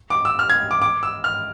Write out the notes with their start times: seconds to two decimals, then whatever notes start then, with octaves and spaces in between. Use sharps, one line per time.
0.10 D6
0.25 E6
0.39 F6
0.50 G#6
0.71 D6
0.82 D6
1.03 E6
1.24 F6